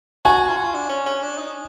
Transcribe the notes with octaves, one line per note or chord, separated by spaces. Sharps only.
F#4 G#5
F4
F#4
F4
D4
C#4
C#4
D4
D#4